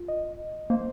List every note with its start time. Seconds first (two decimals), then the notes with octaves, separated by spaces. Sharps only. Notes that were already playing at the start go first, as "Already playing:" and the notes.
Already playing: F4
0.08 D#5
0.70 A#3 C5